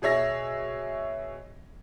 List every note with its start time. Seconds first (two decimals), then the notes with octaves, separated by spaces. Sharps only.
0.02 B2 G#4 C#5 E5 A#6